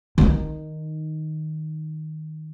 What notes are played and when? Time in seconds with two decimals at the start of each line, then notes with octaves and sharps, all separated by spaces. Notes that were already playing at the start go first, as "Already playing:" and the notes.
0.18 D#3 D#4